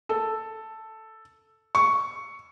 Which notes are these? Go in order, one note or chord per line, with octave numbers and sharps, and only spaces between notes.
A4
C#6